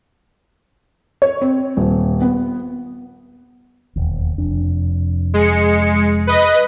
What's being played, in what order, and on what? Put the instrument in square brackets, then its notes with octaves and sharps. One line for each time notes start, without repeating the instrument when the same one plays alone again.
[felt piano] C#5
C4
D#1
B3
[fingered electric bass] E1 D#2
F1 F2 D4
[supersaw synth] G#3 C#7
B4 D#5